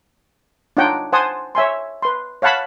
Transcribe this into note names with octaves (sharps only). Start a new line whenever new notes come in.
D4 D#4 F4 C#5 F#5 G5
C5 F#5 G#5 A5 C6 D#6
C#5 E5 G#5 C6
B4 C6
C#5 F5 F#5 A5 B5